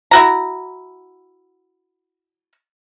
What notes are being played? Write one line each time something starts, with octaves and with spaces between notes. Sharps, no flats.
E4 F#4 A#5